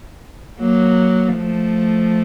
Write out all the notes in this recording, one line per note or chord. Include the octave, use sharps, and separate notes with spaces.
F#3 A#3
F3 A3